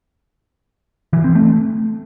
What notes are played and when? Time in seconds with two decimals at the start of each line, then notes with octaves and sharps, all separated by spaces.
1.13 E3
1.24 C4
1.35 A3